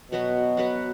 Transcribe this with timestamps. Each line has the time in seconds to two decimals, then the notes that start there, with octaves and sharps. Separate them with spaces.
0.11 B2 F#3 B3 F#4 B4
0.57 F#3 B3 F#4 B4